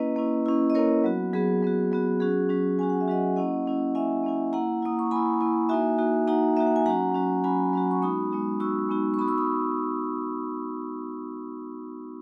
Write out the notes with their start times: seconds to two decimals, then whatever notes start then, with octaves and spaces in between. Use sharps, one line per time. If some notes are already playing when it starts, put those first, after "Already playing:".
Already playing: A#3 C#4 E4 B4 D#5
0.16 A#3 C#4 E4
0.46 A#3 C#4 E4
0.70 D#5
0.74 A#3 C#4 E4 A#4 C#5
1.04 F#3 B3 F#4
1.33 F#3 B3 F#4 G#4
1.62 F#3 B3 F#4
1.92 F#3 B3 F#4
2.20 F#3 C#4 F#4 G#4
2.49 F#3 C#4 F#4
2.78 F#3 C#4 F#4 G#5
2.90 F#5
3.01 E5
3.08 F#3 C#4 F#4 D#5 F#5
3.36 A#3 C#4 E4 D#5 F#5
3.66 A#3 C#4 E4
3.95 A#3 C#4 E4 E5 G#5
4.24 A#3 C#4 E4
4.53 A#3 E4 F#5 A#5
4.82 A#3 E4 D#6
4.99 C#6
5.11 A#3 E4 G#5 B5
5.41 A#3 E4
5.69 A#3 D#4 F#4 E5 G#5
5.98 A#3 D#4 F#4
6.27 A#3 D#4 F#4 F#5 A#5
6.57 A#3 D#4 F#4 E5
6.67 F#5
6.76 G#5
6.86 F#3 C#4 F#4 F#5 A#5
7.14 F#3 C#4 F#4
7.44 F#3 C#4 F#4 G#5 B5
7.73 F#3 C#4 F#4
7.91 C#6
8.02 G#3 B3 D#4 F#4 B5 D#6
8.32 G#3 B3 D#4 F#4
8.60 G#3 B3 D#4 F#4 C#6 E6
8.89 G#3 B3 D#4 F#4
9.14 C#6
9.19 B3 D#4 F#4 B5 D#6
9.28 C#6 E6
9.38 B5 D#6